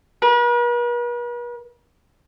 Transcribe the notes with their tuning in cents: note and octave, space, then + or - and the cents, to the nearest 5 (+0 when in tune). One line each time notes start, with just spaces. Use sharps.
B4 -45